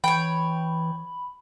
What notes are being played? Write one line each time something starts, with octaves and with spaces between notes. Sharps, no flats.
E3 C#5 G5 B5